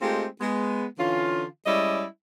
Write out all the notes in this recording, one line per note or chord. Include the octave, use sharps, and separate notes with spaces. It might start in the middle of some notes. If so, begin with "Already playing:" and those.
G#3 A3 C4 D#4 F4 G4
G#3 B3
D3 E3 C#4 F4
G3 G#3 C#4 E4 D5 D#5